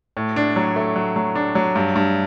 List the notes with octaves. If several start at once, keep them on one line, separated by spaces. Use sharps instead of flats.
A2
D4
F#3
A3
F#3
F#3
D4
F#3
G2
G2